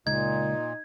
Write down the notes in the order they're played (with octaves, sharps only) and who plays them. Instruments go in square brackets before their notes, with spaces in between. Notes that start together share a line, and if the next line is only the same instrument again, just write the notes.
[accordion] A#2 [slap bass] C#3 G#3 [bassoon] D#4 [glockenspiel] G#6